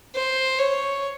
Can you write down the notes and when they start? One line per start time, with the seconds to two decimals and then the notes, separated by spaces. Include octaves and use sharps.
0.15 C5
0.59 C#5